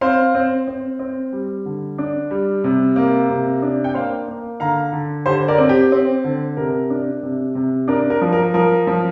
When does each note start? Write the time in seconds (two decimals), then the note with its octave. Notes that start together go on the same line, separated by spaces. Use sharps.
0.01 C4 C5 F5
0.35 C4
0.67 C4
0.99 C4
1.32 G3
1.65 D3
1.98 D4
2.31 G3
2.64 C3
2.96 A#3
3.30 C3
3.62 D4
3.84 G5
3.94 A#3 C5 F5
4.28 A#3
4.60 D3 F5 A#5
4.93 D3
5.26 D3 G4 C5
5.48 A#4 D5
5.58 C4
5.69 G4
5.92 C4
6.24 D3
6.57 C3 A#4
6.90 D4
7.23 C3
7.55 C3
7.88 D4 A#4
8.10 A#4
8.21 F3
8.33 A#4
8.54 F3 A#4
8.87 F3